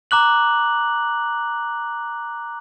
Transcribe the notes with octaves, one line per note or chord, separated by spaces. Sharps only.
A#5 D6 F#6 F#7